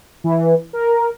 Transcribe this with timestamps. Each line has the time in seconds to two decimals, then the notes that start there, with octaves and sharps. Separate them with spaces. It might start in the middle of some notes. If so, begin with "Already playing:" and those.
0.24 E3
0.73 A#4